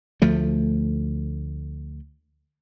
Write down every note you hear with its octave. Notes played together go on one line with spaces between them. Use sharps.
D2 F3 A3